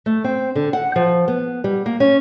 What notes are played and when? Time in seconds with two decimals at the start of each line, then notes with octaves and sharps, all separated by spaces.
0.06 A3
0.24 C4
0.56 D3
0.73 F#5
0.96 F3
1.28 B3
1.64 G3
1.86 A#3
2.00 C#4